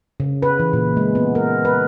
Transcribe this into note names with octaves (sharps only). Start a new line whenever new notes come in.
C#3
B4
E3
A#2
G#3
B3
A#4
B4